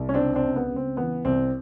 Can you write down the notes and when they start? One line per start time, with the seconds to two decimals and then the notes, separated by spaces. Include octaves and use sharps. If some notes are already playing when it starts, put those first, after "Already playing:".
Already playing: C2
0.09 C#4
0.14 C#2 C4 D4
0.35 C4 D4
0.42 C#2
0.56 B3
0.70 C#2
0.76 C4
0.97 E3 B3
1.25 C2 C4